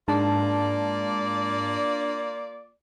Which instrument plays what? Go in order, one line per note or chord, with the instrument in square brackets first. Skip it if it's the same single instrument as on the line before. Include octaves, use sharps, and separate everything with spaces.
[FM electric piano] G#2 G#3 A5 [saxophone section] A#3 F4 D5 [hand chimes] D4